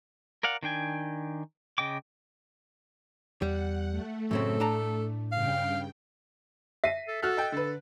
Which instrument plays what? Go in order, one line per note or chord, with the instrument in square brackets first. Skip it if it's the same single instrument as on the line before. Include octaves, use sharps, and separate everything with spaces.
[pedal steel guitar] A#4 D5 F5 F#5
D#3 D4 G5 G#5
C#3 D#5 G5 D6
[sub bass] E2 [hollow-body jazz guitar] G3 [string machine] F#5
[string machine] A3
[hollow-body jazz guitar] F#2 C#3 C4 [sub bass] A2 [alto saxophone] A4
[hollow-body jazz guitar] D4 A5 A#5
[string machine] G2 C#3 G5 [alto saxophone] F5
[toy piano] E5 [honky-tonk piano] B6 C7 D#7
[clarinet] A4
[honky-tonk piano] F#4 F6 F#6 [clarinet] A4
[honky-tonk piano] D#5 G5
[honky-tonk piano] D3 B4 [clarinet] A4